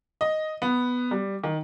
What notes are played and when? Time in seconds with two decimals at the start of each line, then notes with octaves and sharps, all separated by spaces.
0.21 D#5
0.62 B3
1.11 G3
1.44 D#3